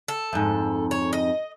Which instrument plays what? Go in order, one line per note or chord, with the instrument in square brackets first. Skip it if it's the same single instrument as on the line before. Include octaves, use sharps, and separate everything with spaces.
[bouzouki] A4
[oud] F2 G#2
[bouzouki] C#5
D#5